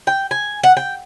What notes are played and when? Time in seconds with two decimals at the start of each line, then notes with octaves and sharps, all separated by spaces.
0.07 G5
0.31 G#5
0.63 F#5
0.77 G5